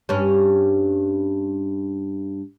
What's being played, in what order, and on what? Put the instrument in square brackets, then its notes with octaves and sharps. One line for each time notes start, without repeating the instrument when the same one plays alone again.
[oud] G2 C#4